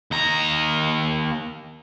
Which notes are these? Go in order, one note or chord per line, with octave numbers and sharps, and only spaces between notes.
D#2 A#5